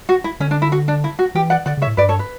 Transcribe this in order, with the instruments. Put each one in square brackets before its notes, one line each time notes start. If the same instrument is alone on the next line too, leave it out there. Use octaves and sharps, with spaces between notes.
[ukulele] F#4
E4
[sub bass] D3 [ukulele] C#4
[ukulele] D4
E4
F#4
D4
E4
F#4
[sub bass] E3 [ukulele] G4
[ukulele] D5 F#5
[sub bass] D3 [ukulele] D5 F#5
[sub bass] C#3
[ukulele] C#5 E5
[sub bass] A2
[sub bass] G2 [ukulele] B4 D5
[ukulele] A4 C#5
B4